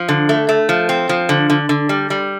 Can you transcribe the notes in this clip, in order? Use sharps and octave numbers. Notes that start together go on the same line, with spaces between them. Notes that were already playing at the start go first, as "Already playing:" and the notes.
Already playing: F3
D3
A3
A3
F3
C4
F3
D3
D3
D3
G3
G3